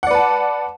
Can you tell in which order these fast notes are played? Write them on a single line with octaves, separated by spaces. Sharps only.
F#5 D5 B4 A5